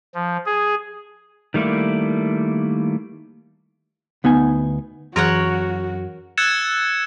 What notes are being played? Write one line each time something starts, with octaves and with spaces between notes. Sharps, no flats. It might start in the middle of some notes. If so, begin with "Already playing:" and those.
F3
G#4
D#3 G3 A3 A#3 E4
D2 B3 D#4 G#5
F#2 E3 F#4 G#4 A#4 C#5 F#5
E6 F#6 G#6 A6 C#7 E7